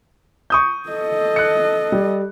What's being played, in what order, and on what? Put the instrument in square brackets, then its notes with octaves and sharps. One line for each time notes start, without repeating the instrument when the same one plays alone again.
[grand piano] C#6 D#6 G6
[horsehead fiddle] A4 D#5
[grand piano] F#6 C#7
G3